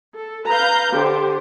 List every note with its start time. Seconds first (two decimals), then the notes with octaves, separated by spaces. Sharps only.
0.15 A4
0.47 B4 F5 A#5 G6
0.93 D3 G4 C5